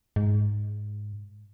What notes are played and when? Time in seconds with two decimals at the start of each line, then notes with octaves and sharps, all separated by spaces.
0.16 G#2